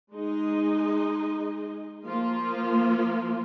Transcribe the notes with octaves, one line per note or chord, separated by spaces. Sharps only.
G#3 D#4 G#4 D#5
F3 A#3 F4